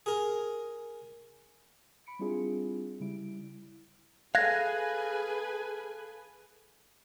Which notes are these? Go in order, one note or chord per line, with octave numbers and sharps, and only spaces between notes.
G#4 A#4
B5 C#7 D7
G3 C4 D4 E4 F4 G#4
C#3 G3 E4 D7
G#4 A4 B4 F5 G#5 F#6 G#6 A#6